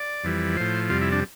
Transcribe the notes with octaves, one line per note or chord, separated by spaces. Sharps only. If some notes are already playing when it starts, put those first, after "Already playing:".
Already playing: D5
F2 E3 G3
A2 F3 C5
F2 C3 G3 F4
E4
D4